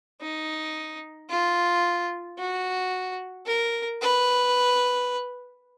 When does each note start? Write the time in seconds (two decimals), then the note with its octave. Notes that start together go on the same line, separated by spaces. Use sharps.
0.21 D#4
1.30 F4
2.38 F#4
3.46 A#4
4.01 B4